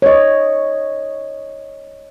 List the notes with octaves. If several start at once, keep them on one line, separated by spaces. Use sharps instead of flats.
C#5 D#5